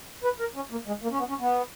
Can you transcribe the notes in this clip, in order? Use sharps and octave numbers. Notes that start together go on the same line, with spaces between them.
B4
A#4
C#4
A#3
G#3
A#3
C#4
B3
C#4
B3